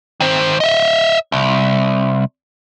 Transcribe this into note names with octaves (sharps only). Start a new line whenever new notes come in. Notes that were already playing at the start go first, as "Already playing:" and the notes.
D#3 C5
D#5 E5
C2